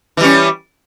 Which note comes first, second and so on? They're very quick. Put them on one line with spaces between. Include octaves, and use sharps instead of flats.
E3 G3 C#4